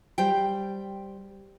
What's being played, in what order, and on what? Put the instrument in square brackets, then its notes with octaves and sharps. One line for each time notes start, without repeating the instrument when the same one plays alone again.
[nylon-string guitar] G3 C5 G5